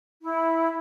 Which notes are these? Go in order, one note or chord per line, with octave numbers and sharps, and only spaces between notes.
E4